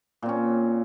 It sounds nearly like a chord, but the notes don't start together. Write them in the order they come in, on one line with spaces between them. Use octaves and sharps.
A#2 C4 C#4